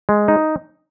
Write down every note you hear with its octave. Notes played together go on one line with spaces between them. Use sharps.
G#3
D#4